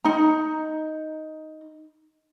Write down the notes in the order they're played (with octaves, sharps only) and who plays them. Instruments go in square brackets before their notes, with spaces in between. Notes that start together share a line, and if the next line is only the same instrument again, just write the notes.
[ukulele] D#4 A#5